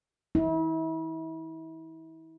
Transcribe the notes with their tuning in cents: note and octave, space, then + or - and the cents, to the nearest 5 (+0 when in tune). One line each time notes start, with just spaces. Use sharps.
E4 -35